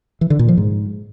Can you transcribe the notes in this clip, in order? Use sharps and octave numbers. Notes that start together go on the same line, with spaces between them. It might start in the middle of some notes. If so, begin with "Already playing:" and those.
E3
D3
A#2
F3
G#2